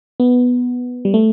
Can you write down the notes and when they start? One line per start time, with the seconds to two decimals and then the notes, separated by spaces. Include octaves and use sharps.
0.20 B3
1.05 G3
1.14 A3